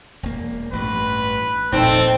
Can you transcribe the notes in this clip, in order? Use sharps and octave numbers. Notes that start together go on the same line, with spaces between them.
E1 A#3
A1 G2 B4
F1 E2 A#2 C4 D#4 A4 D5